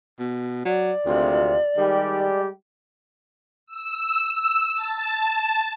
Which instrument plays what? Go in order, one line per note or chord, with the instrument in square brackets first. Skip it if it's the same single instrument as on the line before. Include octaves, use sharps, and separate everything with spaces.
[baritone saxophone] B2
[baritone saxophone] F#3 [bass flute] D5
[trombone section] G#1 C3 F4 [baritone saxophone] D2
[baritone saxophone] D#3 [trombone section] G3 G#3 G4
[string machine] E6
A5